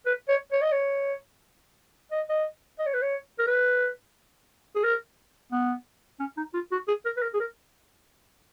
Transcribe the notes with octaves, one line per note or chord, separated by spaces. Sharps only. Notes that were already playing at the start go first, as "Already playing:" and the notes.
B4
C#5
C#5
D#5
C#5
D#5
D#5
D#5
C#5
B4
C#5
A#4
B4
G#4
A#4
B3
C#4
D#4
F4
F#4
G#4
A#4
B4
A#4
G#4
A#4